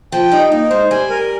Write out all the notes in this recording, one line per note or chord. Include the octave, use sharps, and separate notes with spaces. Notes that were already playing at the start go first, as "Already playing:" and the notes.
F3 G5
G3 D#4
A#3 D#4
G#3 C5
G3 G#5
A#4